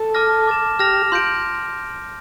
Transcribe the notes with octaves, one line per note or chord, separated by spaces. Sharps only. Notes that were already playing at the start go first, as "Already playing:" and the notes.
Already playing: A4
A5 D6 F6 A#6
D6 A6 E7
G4 F6 A#6 F7
F4 C6 G6 D7